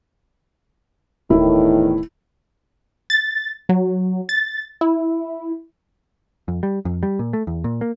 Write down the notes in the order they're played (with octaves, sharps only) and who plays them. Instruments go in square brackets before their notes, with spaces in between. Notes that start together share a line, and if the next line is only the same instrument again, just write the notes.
[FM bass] D1 [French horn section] E2 A2 D#3 [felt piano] E4
[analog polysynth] A6
F#3
A6
E4
[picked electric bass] F2
G3
F2
G3
A#2
A3
E2
A#2
A#3